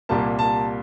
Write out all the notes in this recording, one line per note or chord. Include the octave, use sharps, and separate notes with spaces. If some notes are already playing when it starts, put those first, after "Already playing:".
C2 A#2 G3 A#3 A5
A5